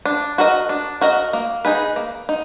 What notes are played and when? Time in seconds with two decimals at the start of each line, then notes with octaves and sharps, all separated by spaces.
0.06 D4
0.38 F#4 A#4 D#5
0.69 D4
1.01 F#4 A#4 D#5
1.33 A#3
1.65 D#4 G#4 B4
1.96 A#3
2.29 D#4